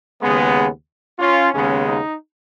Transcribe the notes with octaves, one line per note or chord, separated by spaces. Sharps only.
D#2 C#3 G#3 B3
C#4 F4
D#2 C#3 G#3 B3 C#4
D#4